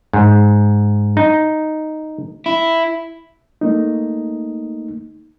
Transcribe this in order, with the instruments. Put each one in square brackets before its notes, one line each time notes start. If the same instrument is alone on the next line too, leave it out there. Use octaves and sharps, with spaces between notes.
[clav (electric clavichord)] G#2
D#4
[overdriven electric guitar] E4
[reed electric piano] A3 A#3 D#4